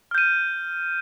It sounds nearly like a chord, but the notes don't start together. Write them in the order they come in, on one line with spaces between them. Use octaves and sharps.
F6 G6 D#7